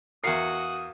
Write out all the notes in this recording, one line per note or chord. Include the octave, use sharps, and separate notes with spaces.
E2 F#4 A#4 F5 D#6 C7 C#7